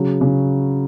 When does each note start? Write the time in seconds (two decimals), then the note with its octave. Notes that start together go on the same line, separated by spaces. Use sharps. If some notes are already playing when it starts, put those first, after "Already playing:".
Already playing: C#3 F#3
0.21 C#3